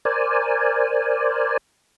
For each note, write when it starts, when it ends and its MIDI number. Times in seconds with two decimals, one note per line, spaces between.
0.05 1.57 70
0.05 1.57 72
0.05 1.57 74
0.05 1.57 80